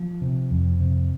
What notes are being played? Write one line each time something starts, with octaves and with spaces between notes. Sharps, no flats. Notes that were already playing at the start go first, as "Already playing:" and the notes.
Already playing: F3
C3
F2
C3